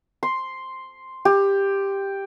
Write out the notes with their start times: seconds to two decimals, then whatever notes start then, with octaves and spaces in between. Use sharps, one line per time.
0.23 C6
1.25 G4